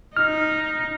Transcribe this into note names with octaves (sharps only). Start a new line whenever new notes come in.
D#4 F6